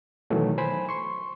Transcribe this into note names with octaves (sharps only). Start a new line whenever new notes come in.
B2 D#3 E3 F#3 A3
C5 G#5 B5
C6 C#6